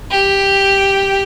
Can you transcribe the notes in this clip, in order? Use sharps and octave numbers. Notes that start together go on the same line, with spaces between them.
G4